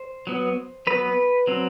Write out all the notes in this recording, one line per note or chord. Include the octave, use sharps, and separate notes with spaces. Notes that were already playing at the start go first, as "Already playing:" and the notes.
Already playing: C5
F#3 B3
F#3 B3 B4
F#3 C4